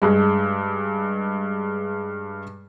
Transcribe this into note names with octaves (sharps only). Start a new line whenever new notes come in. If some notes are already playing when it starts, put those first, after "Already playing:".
G2 G#3